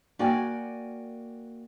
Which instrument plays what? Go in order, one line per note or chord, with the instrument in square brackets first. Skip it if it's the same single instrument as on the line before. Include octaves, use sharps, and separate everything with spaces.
[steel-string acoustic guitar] A#3 F#4 D5 G5 G#5